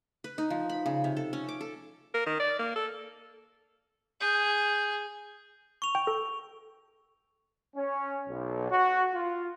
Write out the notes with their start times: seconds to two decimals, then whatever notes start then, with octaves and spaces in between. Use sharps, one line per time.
0.24 B4
0.38 D#4
0.50 F3
0.69 B5
0.86 C#3
1.04 C3
1.17 A4
1.33 C#4
1.49 D6
1.61 A4
2.14 A#4
2.26 D#3
2.40 D5
2.59 A#3
2.75 A4
4.21 G#4 G6
5.82 C#6 F7
5.95 G5
6.07 A4
7.75 C#4
8.27 B1
8.70 F#4
9.14 F4